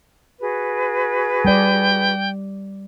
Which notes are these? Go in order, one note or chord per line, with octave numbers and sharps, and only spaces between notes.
F#4 G#4 B4
G3 D5 G5